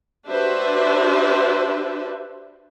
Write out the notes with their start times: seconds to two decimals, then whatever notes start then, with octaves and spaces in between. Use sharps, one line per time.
0.29 D4 F#4 G4 B4 C5 E5